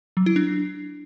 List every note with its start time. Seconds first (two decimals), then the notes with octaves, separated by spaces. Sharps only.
0.17 F#3
0.26 E4
0.36 D4